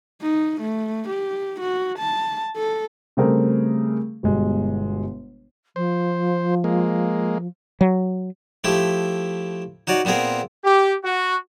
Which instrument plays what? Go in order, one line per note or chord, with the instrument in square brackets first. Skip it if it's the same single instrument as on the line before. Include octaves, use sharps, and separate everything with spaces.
[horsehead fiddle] D#4
A3
G4
F#4
A5
A4
[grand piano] C#3 G3 A3 C4 G#4 A#4
G1 B2 G3 G#3
[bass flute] F3 [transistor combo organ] C5
[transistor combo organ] G#3 A#3
[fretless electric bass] F#3
[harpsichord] F3 A3 E4 G4
D#4 F#4 C#5 D5
A#2 B3 C4 G#4 A#4
[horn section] G4
F#4